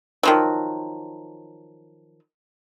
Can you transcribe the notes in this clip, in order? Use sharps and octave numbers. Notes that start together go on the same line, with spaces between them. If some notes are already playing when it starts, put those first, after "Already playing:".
D#3 F3 F#3